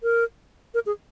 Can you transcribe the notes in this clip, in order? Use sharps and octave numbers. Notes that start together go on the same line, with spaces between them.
A#4
A#4
G#4